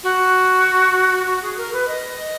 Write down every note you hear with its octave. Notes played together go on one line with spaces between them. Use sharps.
F#4
F#4
G#4
A#4
B4
D#5